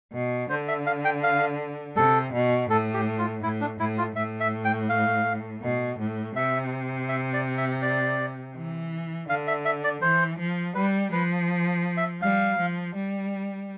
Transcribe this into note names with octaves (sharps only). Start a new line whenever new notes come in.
B2
D3 C5
E5
F5
G5
F5
C3 A4
B2
A2 A4
G4
F4
A2 E4
D4
A2 E4
F4
A2 E5
E5
G5
F5
B2
A2
C3 E5
E5
D5
E5
D5
E3
D3 F5
E5
E5
D5
E3 C5
F3
G3 B4
F3 B4
E5
G3 F5
F3
G3